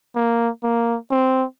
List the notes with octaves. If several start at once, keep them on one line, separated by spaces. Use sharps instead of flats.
A#3
A#3
C4